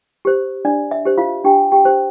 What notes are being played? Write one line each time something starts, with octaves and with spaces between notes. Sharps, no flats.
G4 C5
D4 D5
E5
G4 C5
F4 F5
D4 G4 G5
G4 G5
G4 C5